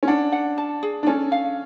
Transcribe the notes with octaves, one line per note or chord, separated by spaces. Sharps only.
C#4
D4 F#5
F#5
A5
G#4
D4
C#4 A4
F5